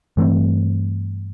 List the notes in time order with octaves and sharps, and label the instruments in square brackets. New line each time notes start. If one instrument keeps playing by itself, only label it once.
[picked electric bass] G2 E3 A3 C4